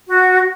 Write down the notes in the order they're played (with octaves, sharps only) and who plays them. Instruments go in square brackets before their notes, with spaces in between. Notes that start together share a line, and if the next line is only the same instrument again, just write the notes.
[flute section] F#4